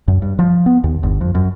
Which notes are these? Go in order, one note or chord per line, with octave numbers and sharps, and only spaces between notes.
F#2
G2
F3
B3
D#2
G1
F2
F#2